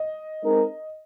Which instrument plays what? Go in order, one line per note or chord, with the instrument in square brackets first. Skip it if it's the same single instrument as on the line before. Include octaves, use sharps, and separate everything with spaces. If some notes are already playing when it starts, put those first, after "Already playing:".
Already playing: [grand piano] D#5
[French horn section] G#3 C4 D#4 A#4